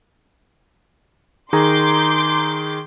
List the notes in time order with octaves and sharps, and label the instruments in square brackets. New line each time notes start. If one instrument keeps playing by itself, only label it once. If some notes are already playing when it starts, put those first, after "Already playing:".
[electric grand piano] D#3 G#4 A#5 [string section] C6 D6 G6